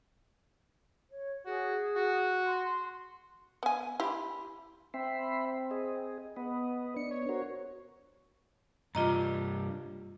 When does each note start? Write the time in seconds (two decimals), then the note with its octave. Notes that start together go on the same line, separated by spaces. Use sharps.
1.10 C#5
1.46 F#4 G#4
1.96 F#4
2.46 C6
3.63 B3 G#5
4.00 E4 G4 B5 C6
4.94 C4 E5 B5 C6
5.71 G#4 D#5
6.37 B3 B4 D#5
6.96 B3 D4 C#7
7.11 C#5
7.29 F#4 A#4 C5
8.95 G2 C3 G3 F4 D#5 A#5